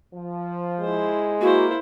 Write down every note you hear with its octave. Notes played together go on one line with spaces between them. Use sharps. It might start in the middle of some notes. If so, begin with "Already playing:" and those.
F3
G#3 E4 C5
A#3 E4 F#4 C5